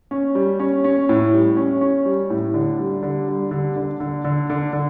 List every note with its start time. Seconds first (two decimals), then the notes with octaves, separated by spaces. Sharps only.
0.11 C#4
0.35 G3
0.60 C#4
0.84 C#4
1.09 A2
1.33 G3
1.57 C#4
1.81 C#4
2.05 G3
2.30 A2
2.54 D3
2.79 G3
3.03 D3
3.28 G3
3.51 D3
3.76 D3
4.00 D3
4.25 D3
4.50 D3
4.73 D3